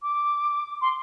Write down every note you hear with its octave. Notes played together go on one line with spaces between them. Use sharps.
D6
C6